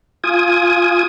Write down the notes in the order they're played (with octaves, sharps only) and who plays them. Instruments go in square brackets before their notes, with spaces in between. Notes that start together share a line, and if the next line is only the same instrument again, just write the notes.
[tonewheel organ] F4 G#5 D#6